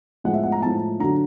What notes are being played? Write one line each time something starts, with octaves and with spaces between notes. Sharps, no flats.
A2 F3 G#3 F#5
E5
F#5
A#5
A2 F3 G#3 A5
D3 F#3 A#5